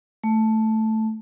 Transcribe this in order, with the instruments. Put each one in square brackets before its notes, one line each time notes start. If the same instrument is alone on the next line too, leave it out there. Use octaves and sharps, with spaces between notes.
[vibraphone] A3